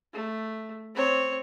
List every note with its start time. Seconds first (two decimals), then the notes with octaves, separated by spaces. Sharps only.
0.13 A3
0.94 C4 C#5